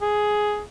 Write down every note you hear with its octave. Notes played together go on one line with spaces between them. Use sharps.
G#4